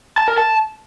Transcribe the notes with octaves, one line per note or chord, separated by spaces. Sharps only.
A5
A#4
A5